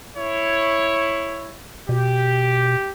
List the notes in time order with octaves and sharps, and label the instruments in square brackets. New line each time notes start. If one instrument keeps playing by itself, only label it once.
[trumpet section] E4 C#5
[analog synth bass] B2 [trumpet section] G4